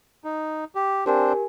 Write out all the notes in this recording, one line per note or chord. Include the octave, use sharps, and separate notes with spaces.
D#4
G4
C4 D4 G4 A#4 C5 G#5